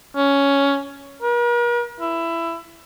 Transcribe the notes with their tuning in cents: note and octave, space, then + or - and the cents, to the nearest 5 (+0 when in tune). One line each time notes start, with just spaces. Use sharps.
C#4 +10
A#4 +45
E4 +15